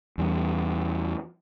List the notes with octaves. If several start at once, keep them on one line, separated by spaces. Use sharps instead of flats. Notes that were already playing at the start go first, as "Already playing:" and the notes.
E2 G3